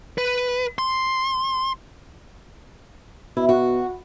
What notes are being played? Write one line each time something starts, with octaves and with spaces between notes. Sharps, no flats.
B4
C6
B2 E4
F#4